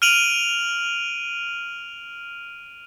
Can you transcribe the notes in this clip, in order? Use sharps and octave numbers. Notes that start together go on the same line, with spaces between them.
F6 D7 D#7 F7 F#7